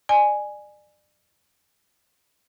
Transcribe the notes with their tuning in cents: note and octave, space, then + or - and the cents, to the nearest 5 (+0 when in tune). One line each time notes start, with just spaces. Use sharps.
D5 +35 G#5 +0